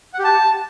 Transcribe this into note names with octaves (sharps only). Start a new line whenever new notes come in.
F#5
G4
A5